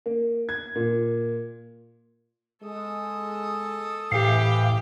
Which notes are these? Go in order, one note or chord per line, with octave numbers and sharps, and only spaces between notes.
A#3
G#6
A#2
G#3 A4 D#6
A2 E3 G4 F5